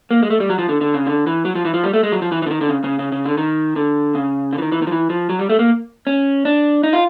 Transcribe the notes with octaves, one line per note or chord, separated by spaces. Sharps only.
A#3
G#3
A3
G3
F#3
F3
D3
D3
C#3
D3
E3
F#3
F3
E3
F3
G3
A3
G#3
F#3
F3
E3
E3
D3
D#3
D3
C#3
C#3
C#3
C#3
D3
D#3
D3
C#3
D3
E3
D#3
E3
D#3
F3
E3
F3
F#3
G3
A3
A#3
C#4
D4
D#4
F4